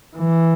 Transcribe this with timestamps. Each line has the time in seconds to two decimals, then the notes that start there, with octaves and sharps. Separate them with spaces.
0.17 E3